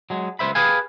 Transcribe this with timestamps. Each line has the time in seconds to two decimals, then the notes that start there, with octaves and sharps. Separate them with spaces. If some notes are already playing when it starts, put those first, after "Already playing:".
0.10 F#3 G#3
0.39 C#2 C5 E5 B5
0.55 G4 G#4 B4 F5 G#5